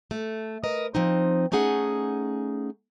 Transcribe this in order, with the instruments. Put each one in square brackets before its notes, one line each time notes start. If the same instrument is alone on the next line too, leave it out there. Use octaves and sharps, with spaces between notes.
[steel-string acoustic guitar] A3
A#4 B4 D#5
F3 C4 D#4
A3 C#4 D#4 G#4 F#5